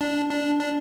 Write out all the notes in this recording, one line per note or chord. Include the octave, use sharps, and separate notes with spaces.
D4
D4
D4